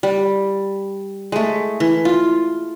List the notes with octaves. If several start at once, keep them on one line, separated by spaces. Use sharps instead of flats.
G3
G#3 A3
E3
F4